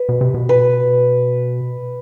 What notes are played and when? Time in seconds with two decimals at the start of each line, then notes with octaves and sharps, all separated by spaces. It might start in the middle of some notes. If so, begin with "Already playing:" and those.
Already playing: B4
0.09 B2
0.21 C3
0.34 B2
0.49 B4